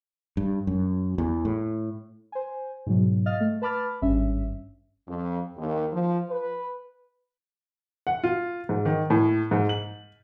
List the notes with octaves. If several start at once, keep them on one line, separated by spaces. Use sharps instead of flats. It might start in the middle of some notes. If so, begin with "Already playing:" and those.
G2
F#2
E2
A2
C5 G#5
G#2 B2 F#3
D#5 F5 F6 A6
A3
B4 A5 B5 D6 F6 A6
G#1 G2 C#4 E5
F2
D#2
F3
B4
F#5
F4
G#2
D#3
A2
G#2
F#7